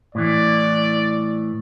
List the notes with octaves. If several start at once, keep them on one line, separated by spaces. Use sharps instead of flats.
A2 E3 D5